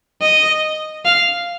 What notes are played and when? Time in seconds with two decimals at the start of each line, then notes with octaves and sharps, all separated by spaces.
0.22 D#5
1.05 F5